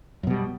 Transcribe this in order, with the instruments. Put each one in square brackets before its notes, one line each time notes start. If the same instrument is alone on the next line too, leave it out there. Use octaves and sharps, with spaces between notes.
[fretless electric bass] F#2
B2
G3